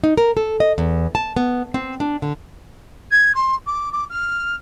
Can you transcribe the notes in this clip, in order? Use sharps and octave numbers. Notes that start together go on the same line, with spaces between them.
D#4
A#4
A4
D#5
E2
A5
B3
C4
D4
D3
G#6
C6
D6
D6
F6